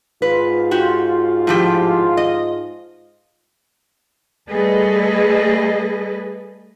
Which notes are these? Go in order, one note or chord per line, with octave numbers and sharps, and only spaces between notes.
G#2 F4 B4
F#4 G4
A2 F3 G4
D#5
G3 A3 G#4 A4 B4 D#5